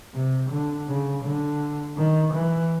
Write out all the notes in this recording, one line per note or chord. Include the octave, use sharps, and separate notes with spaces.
C3
D3
C#3
D3
D#3
E3